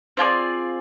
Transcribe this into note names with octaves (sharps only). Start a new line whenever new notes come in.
C4 F4 G#4 D5